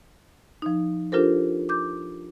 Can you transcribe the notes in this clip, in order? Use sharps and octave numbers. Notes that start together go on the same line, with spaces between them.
F3 D#4
D4 F4 G4 A4 A#4 C5
D6 G6